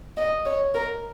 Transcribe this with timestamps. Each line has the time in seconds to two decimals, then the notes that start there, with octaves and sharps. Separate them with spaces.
0.17 D#5
0.45 C#5
0.74 A#4